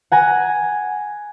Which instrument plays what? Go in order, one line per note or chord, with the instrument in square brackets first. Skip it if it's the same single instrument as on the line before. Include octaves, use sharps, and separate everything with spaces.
[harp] F#5 G#5 A#5